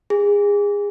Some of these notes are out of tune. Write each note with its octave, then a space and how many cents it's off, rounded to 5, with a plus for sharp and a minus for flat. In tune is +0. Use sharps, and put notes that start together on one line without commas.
G#4 -25